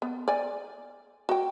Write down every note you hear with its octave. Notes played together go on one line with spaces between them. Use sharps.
B3
D5 G#5
F#4 G5